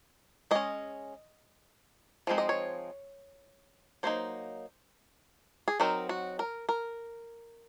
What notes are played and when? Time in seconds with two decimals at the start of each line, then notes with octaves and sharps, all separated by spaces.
0.51 G#3 C#4 D#5
2.27 F3 G#3 C4 D#4
2.38 D#5
2.49 C#5
4.03 F#3 A#3 D#4 C5
5.68 G#4
5.80 F#3 C4 D#4 A#4
6.09 F#4
6.39 A#4
6.69 A#4